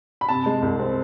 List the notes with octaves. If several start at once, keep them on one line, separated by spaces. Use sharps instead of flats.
B5
C3 A5
G#3
C2
C4